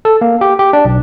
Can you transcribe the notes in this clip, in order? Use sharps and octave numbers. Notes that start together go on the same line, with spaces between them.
A4
A#3
G4
G4
D4
B1